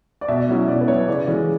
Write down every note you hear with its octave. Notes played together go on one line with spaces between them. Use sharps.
D5
B2 E5
F#3 C#4 E4
B2 D5
B4
F#3 C#4 E4 C#5
C#3 D5
E3 G#3 C#4